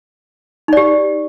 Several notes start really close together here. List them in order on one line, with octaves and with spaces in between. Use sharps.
D#4 D5 G4